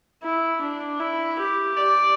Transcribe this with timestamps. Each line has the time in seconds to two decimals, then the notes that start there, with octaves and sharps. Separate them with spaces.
0.23 E4
0.62 D4
1.00 E4
1.39 G4
1.77 D5